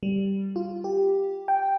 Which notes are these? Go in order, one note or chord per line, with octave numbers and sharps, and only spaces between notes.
G3
F4
G4
G5